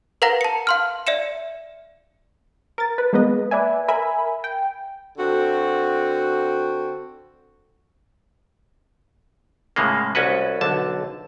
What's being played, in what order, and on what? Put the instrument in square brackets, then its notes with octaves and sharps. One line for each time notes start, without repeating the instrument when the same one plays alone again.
[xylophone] A#4 B4 F5 F#5 A#5 A#6
A5 C#7
F5 C6 F6
D5 E5 C#7 E7
[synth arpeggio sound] A#4 A6
B4
G#3 A#3 B3 B4 D#5
B4 D5 E5 G#5
A#4 E5 G#5 B5
G5
[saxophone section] D3 C4 F#4
[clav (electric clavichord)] A2 C#3 G#3 A#3
C2 C#4 F#4 B4
B1 D3 A5